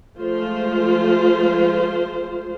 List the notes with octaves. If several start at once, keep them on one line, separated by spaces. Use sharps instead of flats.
F3 G#3 A3 F4 C5